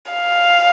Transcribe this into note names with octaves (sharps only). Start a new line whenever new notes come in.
F5